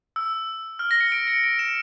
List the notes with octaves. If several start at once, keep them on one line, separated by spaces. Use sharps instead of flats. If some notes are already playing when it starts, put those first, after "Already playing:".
E6
F6
A#6
C#7
D7
C#7
D7
E7